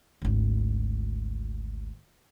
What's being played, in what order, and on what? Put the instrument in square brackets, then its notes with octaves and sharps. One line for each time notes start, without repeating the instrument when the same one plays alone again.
[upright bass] G#1 D2